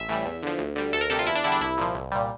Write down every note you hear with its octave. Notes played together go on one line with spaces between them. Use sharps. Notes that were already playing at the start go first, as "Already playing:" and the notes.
Already playing: A1 E5
A2 E3 G3
E2
D3 F3
D2
D3 G3
D2 A4
A#4
C3 G3 A4
F4
E2 E4
D4
D3 G3 E4
D4
C2 E4
A#2 F3
C2
A#2 G3